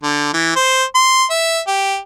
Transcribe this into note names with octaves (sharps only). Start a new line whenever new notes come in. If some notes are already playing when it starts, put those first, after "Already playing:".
D3
E3
C5
C6
E5
G4